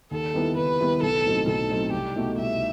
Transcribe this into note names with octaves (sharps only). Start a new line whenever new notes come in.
D#2 A4
D#3 G3 B3 E4
D#2 B4
D#3 G3 B3 E4
B1 A4
A2 F#3 C4 D#4
B1 A4
A2 F#3 C4 D#4
C2 G4
B2 A3 D#4 F#4
C2 E5